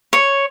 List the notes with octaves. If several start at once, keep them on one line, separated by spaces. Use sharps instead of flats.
C#5